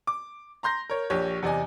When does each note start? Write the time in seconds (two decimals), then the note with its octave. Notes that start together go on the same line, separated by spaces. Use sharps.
0.07 D6
0.63 A#5 C6 G6 A#6
0.90 A#4 C#5
1.10 A#1 G4 C#5
1.42 E2 C3 D5 D#5 G#5